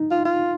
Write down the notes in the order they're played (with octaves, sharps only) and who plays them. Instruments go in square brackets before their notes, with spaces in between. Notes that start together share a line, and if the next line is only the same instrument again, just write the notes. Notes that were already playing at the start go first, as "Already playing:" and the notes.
Already playing: [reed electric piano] D#4
[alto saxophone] F4
F4